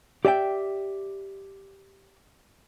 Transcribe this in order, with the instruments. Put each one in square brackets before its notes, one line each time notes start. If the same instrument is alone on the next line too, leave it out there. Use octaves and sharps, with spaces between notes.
[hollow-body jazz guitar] G4 D5 E5 G5